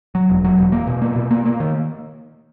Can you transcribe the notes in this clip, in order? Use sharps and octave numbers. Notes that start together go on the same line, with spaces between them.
F#3
E1
F#3
E1
A#3
B2
A#3
B2
A#3
A#3
D#3